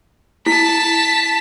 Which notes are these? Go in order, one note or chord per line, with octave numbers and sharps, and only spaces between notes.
E4 A5 B6